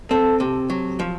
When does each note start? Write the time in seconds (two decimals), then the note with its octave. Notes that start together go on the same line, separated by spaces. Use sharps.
0.11 C4 A4
0.40 C3
0.70 F#3
0.99 F3